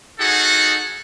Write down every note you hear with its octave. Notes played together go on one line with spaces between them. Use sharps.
D#4 F#4 G#4 A4 F#5